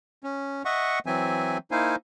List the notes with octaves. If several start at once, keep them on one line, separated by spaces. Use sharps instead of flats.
C#4
D#5 E5 F#5 C#6
E3 F#3 C4 E5 G#5
A#3 D#4 E4 C5 F5 G#5